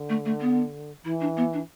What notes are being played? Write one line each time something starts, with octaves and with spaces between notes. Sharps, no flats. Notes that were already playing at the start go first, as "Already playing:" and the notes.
Already playing: D3
A3
A3
B3
E3 E4
D4
B3
D4